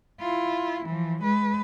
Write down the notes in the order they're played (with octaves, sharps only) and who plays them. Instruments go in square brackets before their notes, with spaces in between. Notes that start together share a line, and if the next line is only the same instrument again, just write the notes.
[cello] E4 F4
E3 F3
G#3 B4